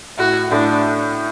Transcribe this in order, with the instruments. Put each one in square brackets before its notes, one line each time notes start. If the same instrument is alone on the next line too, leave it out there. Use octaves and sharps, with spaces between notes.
[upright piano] A2 [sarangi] F#4
[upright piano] A2 [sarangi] D4